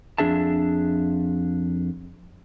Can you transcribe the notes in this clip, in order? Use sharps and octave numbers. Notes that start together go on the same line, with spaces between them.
F2 C3 D4 G#4 E5 A5